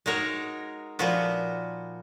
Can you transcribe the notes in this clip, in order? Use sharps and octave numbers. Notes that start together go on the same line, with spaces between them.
G#3 D#4 F#4 A#4 C#5
A#2 F3 B3 F#4